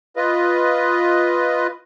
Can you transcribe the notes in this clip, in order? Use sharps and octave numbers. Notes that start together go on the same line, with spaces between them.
F4 B4 D#5